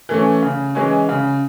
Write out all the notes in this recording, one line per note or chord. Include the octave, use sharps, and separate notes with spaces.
E3 A3 C#4
C#3
E3 G#3 C#4
C#3